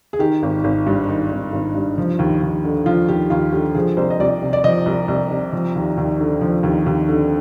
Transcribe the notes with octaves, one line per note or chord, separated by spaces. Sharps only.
G#4
D#3 G4
G#1
G#1
G2
D#3 D#4
G#1
G#1
G2
F3
D#2
D#2
D3
F3 F4
D#2 G4
D#2 F4
D3 G4
F3 G#4
C2 C5
D#5
C2 D5
C3
D5
F3 D#5
C2
C2
C3
F3
D#2
D#2
D3
F3
D#2
D#2
D3